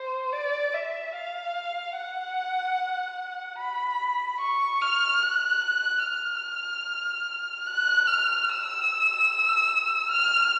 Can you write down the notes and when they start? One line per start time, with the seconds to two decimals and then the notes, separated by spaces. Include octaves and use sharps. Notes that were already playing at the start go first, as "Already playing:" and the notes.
Already playing: C5
0.33 D5
0.74 E5
1.15 F5
1.96 F#5
3.59 B5
4.40 C#6
4.82 F6
5.23 F#6
6.03 F6
7.67 F#6
8.07 F6
8.49 E6
10.11 F6